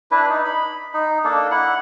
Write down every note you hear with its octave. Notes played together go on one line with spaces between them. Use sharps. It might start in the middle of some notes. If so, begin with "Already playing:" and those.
D4 E4 B4
D#4
B5
D#4
A#3 D4 A4
E4 F#5